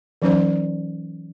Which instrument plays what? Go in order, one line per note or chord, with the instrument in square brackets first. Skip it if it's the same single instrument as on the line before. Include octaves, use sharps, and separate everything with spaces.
[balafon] E3 F#3 C#4 D#4 C5 D5